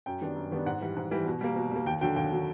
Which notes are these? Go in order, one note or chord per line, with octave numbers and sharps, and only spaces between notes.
F#2 G5
D#3 G3 B3 D4
F#2
D#3 G3 B3 D4
G#2 F#5
E3 G3
G#2
E3 G3
B2
G3 A#3
B2
G3 A#3
D#2 G5
D3 F#3 G5
D#2 G5
D3 F#3